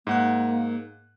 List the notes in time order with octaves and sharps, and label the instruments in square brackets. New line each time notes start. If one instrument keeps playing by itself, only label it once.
[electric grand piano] G#2 F#5 F#6 [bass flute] A#3